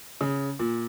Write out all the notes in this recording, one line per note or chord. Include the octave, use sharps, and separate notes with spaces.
C#3
A#2